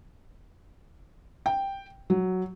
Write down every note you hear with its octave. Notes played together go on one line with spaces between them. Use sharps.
G5
F#3